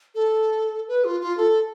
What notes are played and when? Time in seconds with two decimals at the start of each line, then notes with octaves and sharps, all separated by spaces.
0.15 A4
0.88 B4
1.05 F4
1.21 F4
1.37 A4